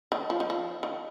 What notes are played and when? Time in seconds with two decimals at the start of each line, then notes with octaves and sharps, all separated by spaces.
0.12 D#3
0.30 F3
0.40 D#3
0.50 F3
0.83 D#3